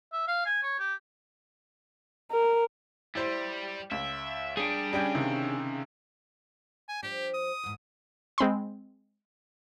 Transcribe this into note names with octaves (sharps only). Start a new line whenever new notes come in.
E5
F5
G#5
C#5
G4
A#4
G3 E4 C5
C#2 E5
G3 D4 G#4
C#3 G3 G5 G6
C3 D#3
G#5
F3 D4 G4
D#6
E2 G#2
G#3 C4 B5 C6